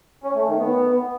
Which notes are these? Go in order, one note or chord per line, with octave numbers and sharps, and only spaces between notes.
C#4
A3
D#3
B3